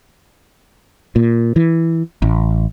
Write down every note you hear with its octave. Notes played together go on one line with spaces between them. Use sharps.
A#2
E3
A1